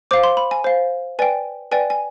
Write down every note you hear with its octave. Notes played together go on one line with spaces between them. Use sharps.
C5 F5 D6
C6
B5
G#5
C5 F5
B4 D5 G5 G#5
B4 D5 G5 G#5
G#5